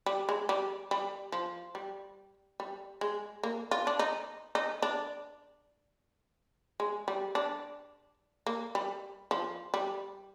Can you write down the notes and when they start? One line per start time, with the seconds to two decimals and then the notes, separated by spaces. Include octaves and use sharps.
0.06 G3
0.29 G#3
0.49 G3
0.91 G3
1.32 F3
1.75 G3
2.60 G3
3.01 G#3
3.43 A#3
3.71 F4
3.87 D4
3.99 D#4
4.55 D#4
4.82 D4
6.80 G#3
7.08 G3
7.35 D4
8.47 A#3
8.75 G3
9.31 F3
9.74 G3